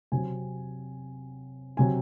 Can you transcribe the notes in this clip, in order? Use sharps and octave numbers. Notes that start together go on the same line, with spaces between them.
C3 F#3 C4 G#5
C3 F#3 G#5